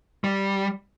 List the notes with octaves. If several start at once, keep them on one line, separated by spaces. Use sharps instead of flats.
G3